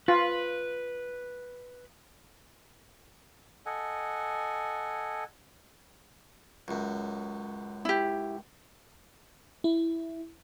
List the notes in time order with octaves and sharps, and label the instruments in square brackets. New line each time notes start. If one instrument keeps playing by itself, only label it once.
[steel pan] F4 [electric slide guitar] B4
[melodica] A4 D#5 F#5 G#5
[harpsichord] C#2 F#2
[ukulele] E4 G4
[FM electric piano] E4